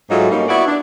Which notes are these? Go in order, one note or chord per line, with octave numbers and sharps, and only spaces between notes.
G#2 F#3 A3 D#4 F4
G3 A#3 C#4 D#4
B3 E4 F#4 D5
D4